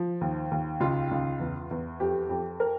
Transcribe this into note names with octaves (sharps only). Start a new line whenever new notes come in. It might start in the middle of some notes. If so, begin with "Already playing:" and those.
Already playing: F3
D#2
D#2
C#2 F4
C#2
E2
E2
F2 G4
F2
A#4